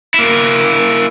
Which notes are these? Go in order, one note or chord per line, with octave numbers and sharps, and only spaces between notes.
A#3 E4